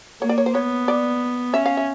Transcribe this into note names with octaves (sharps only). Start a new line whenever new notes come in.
A#3 C#5
D5
C#5
C5
B3 C#5
D5
C#4 E5
F5
E5